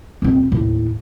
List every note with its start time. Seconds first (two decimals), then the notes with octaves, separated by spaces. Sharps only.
0.22 D#1 C4
0.52 D#2 A2